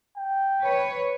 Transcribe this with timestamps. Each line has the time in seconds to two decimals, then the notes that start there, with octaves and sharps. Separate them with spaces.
0.17 G5
0.63 B4 C#5